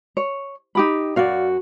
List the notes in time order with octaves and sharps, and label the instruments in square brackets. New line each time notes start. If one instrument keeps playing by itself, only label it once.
[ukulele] C#5
D#4 G4 B5
[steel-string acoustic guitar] F#2 F#4 [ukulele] D5 F5